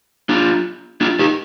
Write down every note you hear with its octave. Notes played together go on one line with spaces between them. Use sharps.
D4 F4
D4 F4
D#4 G4